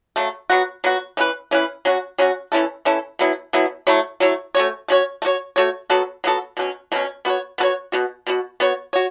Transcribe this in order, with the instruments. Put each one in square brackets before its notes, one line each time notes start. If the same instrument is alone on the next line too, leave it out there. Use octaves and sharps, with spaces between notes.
[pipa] C#3 F#3 A3
F#3 B3 F#4
F#3 B3 F#4
E3 C#4 E4 B4
E3 C#4 E4 B4
F#3 C#4 F#4
F#3 C#4 F#4
E3 C#4 E4 A4
E3 C#4 E4 A4
B2 F#3 B3 E4
B2 F#3 B3 E4
F#3 A3 E4 C#5
F#3 A3 E4 C#5
A3 C#4 F#4 C#5
A3 C#4 F#4 C#5
A3
F#4 C#5
A3 F#4 C#5
F#3 B3 F#4 A4
F#3 B3 F#4 A4
B2 F#3 C#4
B2 F#3 C#4
B3 F#4 A4 C#5
B3 F#4 A4 C#5
B2 B3 F#4
B2 B3 F#4
B3 F#4 C#5
F#4 C#5